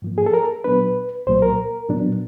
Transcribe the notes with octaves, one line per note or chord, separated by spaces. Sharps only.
G#2 F3 A#3
G#4
A4
A#4
A#2 F#3 B3 D4 B4
C2 A#2 F#3 A#3 C5
A#4
A#2 F#3 B3 D4